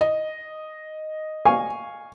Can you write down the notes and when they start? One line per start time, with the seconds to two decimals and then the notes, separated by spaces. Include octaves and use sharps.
0.01 D#5
1.45 F5 G#5 C#6